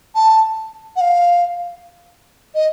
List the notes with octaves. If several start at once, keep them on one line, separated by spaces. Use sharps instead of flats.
A5
F#5
F5
D#5